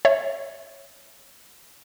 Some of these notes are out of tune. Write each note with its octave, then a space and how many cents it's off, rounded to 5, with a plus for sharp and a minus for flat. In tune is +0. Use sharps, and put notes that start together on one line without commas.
C#5 -10 E5 +0